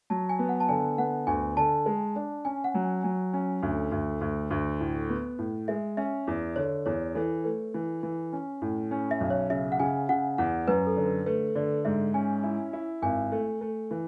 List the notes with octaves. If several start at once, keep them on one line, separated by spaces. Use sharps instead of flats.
F#3 A5
G#5
B3
F#5
A5
D3 G#5
B3 F#5
D2 G#5
D3 A5
G#3
D4
C#4 G#5
F#5
F#3
G#5
F#3 G#5
C#4
D2 A4
D2
D2
D2
A2
B3
A2
G#3 E5
C#4 E5
E2
D3 C#5
E2 C#5
E3 A4
A3 B4
E3
E3
C#4
A2
C#4
E5
B1
C#5
C#3 E5
F#5
C#3 G#5
C#3 F#5
E2 F#5
F#2 B4
A4
D3
B4
A3 B4
D3 D5
G#2 E5
C#4 G#5
E4
E4
G#1 G#5
A3
A3
E3